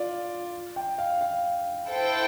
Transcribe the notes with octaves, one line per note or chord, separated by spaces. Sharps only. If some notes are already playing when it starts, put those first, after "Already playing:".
Already playing: F4 D5
G5
F5
F5
E4 A4 C5 G5